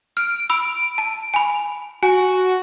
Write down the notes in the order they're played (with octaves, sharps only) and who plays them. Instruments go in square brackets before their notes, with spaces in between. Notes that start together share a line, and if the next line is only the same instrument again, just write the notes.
[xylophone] F6 [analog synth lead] D7
[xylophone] B5 E6
A5
G#5 B5
[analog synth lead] F#4 [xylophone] G#5